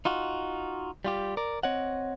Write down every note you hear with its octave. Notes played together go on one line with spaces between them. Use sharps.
D#4 F4 F#4
G3 F4 G4
A#4 D5
C4 C#5 D#5 F#5